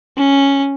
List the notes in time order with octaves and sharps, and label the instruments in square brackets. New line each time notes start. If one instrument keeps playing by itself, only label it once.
[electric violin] C#4